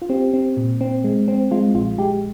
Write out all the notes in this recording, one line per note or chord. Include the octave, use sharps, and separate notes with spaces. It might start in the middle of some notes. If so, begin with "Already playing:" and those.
F4
C4 G4
C4
A#2
C4
G#3
C4
G#3 F4
A#1 F4
G#3 G4